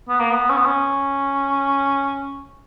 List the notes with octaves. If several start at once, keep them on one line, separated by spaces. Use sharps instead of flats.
B3
A#3
B3
C#4
B3
C#4